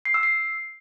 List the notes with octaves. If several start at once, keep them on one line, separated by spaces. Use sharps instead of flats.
C7
E6
C7